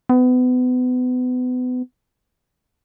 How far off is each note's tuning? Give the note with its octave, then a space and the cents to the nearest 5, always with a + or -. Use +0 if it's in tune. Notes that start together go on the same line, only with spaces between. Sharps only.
B3 +30